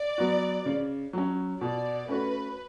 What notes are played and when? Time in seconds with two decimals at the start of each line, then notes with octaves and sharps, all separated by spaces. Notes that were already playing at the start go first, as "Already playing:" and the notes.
Already playing: D5
0.18 F#3 B3 F#4
0.66 C#3
1.13 F#3 C#4
1.60 B2 D5
2.08 A3 C#4 F#4 B4